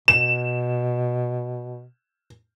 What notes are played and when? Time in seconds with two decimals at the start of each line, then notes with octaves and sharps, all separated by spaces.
0.08 B2 E7